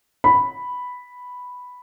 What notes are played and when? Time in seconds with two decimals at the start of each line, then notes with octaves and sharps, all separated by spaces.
0.24 B5